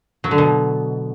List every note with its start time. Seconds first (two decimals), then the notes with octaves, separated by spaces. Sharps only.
0.24 F#3
0.31 D3
0.38 B2